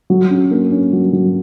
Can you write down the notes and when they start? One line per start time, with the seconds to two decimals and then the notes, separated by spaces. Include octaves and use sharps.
0.10 F#3
0.31 C#4
0.51 A#3
0.72 C#4
0.93 F#3
1.13 F#3